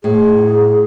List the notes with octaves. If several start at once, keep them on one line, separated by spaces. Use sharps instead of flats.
A2 G#4